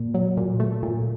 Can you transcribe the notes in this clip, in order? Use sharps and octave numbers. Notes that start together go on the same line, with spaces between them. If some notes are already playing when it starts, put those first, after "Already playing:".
Already playing: A#2
F#3
A#2
A3
A#2